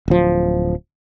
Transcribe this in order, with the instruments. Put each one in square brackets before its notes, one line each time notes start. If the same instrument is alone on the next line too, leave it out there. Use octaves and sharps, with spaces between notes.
[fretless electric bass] D1 F3